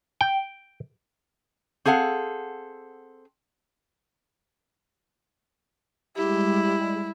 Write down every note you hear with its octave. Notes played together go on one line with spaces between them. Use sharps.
G5
C4 G#4 A4 F5 F#5
G3 G#3 E4 G4